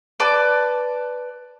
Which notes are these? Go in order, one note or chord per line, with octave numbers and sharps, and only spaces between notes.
B4 D5 A5 D6